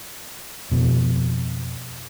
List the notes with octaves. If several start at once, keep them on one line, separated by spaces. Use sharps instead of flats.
F2 B2